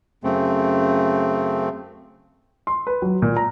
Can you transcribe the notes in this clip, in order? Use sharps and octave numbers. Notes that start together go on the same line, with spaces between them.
F#2 C#3 A3 C4
C6
B4
F#3
A#2
A#5